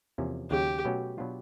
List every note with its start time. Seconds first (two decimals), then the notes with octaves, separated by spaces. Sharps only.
0.18 E2 C3 F3 A#3 C#4
0.51 D#2 C#3 F#3 G4
0.85 B2 F#3 A3 C#4 F#4
1.18 B2 F#3 B3 D4 F4